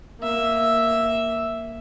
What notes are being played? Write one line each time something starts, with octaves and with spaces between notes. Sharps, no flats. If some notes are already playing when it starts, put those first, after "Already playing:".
A#3 E5